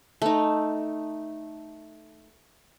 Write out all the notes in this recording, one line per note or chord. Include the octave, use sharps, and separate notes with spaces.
A3 D#4